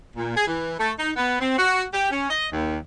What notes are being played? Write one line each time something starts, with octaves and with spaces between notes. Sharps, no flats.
A#2
G#4
E3
A3
D#4
B3
C4
F#4
G4
C#4
D#5
D#2